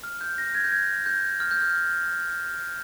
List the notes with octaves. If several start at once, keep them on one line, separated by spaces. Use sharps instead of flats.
F6
G6
A#6
G#6
G6
G#6
G6
F6
G6
F6